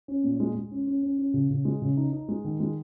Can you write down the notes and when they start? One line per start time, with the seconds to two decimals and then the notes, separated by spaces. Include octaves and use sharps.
0.08 C#4
0.24 A#2
0.40 G#3
0.55 G#3
0.71 C#4
0.87 C#4
1.03 C#4
1.18 C#4
1.34 C#3
1.50 C#3
1.65 G#3
1.82 C#3
1.97 D#4
2.12 D#4
2.29 G#3
2.44 D#3
2.60 G#3